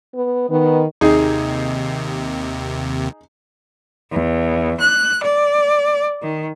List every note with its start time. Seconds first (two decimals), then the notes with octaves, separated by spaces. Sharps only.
0.15 B3
0.50 D#3 B3
1.01 D#2 C3 D#4 G#4
4.10 E2
4.80 F#6
5.22 D5
6.21 D#3